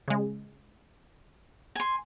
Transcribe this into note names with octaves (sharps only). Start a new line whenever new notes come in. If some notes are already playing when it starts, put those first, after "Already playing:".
C#3 G#3
G#5 C6